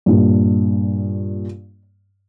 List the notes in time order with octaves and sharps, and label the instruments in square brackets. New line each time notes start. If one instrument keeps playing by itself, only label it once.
[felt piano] G2 A#2